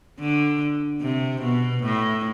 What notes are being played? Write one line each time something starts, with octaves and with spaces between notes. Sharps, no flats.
D3
C3
B2
A2